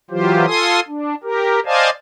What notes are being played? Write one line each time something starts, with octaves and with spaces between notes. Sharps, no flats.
E3 F#3 F4 G4 C5
F4 A4 G#5 C6 D#6
D4
G4 A#4
C5 D5 D#5 F5 G#5 A5